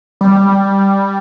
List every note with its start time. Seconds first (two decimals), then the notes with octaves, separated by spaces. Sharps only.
0.21 G3